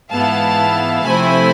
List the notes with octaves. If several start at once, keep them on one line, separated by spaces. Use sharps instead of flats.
G#2 E3 B3 E4 F5 A5
C3 F3 A3 C4 E4 G#5 B5